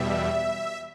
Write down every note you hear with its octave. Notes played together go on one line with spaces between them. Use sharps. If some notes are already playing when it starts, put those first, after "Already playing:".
Already playing: E2 B2 G3 E5